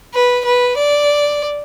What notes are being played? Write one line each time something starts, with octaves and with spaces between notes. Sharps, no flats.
B4
B4
D5